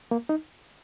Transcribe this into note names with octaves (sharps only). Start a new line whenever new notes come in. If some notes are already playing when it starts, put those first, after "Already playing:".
A#3
D#4